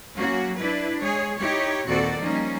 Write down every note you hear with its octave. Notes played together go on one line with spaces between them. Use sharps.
F#3 A#3 C#4 F#4
D4 E4 B4
G#3 G#4 C#5
D#4 E4 G4 C#5
D#2 A#2 C4 F#4 A4 D5
F3 G3 A#3 C#4 D#4